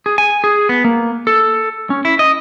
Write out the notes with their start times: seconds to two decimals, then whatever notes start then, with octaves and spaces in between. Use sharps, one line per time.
0.06 G#4
0.18 G#5
0.44 G#4
0.69 B3
0.84 A#3
1.27 A4
1.90 C#4
2.05 E4
2.19 D#5